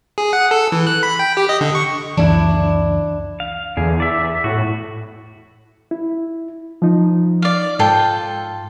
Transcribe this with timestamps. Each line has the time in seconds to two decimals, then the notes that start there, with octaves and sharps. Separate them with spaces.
0.18 G#4
0.33 F#5
0.51 A4
0.72 E3
0.87 F#6
1.03 B5
1.19 G5
1.37 G4
1.49 D#5
1.61 D3
1.75 C#6
2.17 C#2 F#2 E3 D4 E4
3.40 F5
3.77 E2 D3 G#4
4.00 D5 E5
4.44 A2 F#4
5.91 E4
6.82 F3 D#4
7.42 D5 F5
7.79 G#2 F4 A4 G5